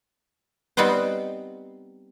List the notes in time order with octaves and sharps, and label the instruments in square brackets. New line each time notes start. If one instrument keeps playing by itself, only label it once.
[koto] G3 B3 C4 D#4 B4 C5